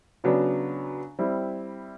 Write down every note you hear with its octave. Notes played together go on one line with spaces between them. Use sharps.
C#3 F#3 B3 D4
G3 C4 E4